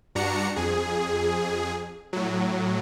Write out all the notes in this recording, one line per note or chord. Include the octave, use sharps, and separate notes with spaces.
G2 D4 F#4 A#5 C#7
F2 G#4
A2 F#3